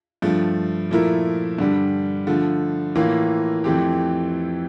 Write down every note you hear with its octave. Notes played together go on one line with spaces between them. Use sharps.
G2 F3 A3
A#2 F3 A3 E4 A#4
G2 D3 G3
D3 F3 A3
A2 E3 A#3 F4
F2 E3 A3 C4 G4